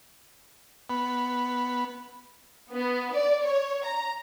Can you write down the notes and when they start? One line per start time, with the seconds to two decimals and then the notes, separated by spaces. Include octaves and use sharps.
0.90 B3
2.72 B3
3.14 D5
3.44 C#5
3.85 A#5